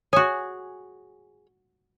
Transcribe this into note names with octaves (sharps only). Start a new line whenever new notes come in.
F#4 G#4 C#5 G#5 D#6